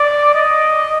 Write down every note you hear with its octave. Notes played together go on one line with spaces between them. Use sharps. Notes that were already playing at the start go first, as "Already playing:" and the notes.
Already playing: D5
D#5